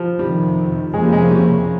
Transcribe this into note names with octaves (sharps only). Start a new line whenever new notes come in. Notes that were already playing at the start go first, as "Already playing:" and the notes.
Already playing: F3 G3
F2 C3 D#3 G3
F2 C3 F3 G#3 A#3 C#4
G3
G#3
G3